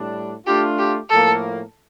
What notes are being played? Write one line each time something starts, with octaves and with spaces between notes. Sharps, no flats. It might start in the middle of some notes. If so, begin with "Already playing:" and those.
Already playing: A2 G3 D4
A3 D4 F4 G4
G4
A2 F3 A#3 A4